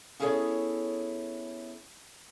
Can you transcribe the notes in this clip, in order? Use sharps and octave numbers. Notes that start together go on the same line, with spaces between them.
B3 C#4 E4 G#4 A4 C#5